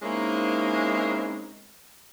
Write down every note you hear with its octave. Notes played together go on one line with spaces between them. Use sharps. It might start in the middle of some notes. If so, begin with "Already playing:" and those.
G#3 A#3 C4 C#4 D#4 E4